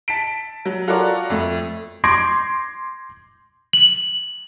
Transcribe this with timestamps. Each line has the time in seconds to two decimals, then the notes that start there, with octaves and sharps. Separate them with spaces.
0.08 A5 B6 D7
0.65 F#3
0.87 F4 F#4 A4 A#4 C#5 D5
1.30 F2 A3
2.04 C6 D6 G6 G#6 A#6 D7
3.73 F#7